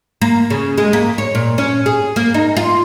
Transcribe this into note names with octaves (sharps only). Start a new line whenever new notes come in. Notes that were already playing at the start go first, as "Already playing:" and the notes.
A#3
C#3
G#3
A#3
C#5
A#2
C#4
G#4
A#3
D#4
F4